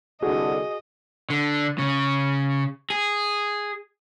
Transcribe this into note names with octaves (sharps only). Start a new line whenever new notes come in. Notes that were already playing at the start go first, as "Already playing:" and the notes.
C2 D3 F#4 G#4 D#5
D3
C#3
G#4